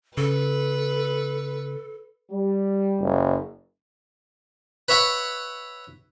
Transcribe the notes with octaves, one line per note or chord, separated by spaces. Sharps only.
C#3 A4 B4
G3
F#1
B4 C#5 E5 F#5 B5